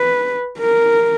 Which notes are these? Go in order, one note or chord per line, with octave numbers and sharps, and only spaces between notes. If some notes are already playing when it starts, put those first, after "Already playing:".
Already playing: B4
A#4